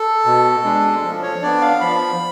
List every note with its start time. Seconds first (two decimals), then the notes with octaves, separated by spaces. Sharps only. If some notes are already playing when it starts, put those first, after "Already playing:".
Already playing: A4
0.25 B2
0.64 G#3 D4
1.03 F3
1.23 C#5
1.42 B3 D4 D5
1.61 F5
1.80 F3 B5